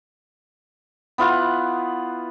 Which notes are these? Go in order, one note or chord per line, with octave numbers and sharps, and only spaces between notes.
B3 E4 F4 F#5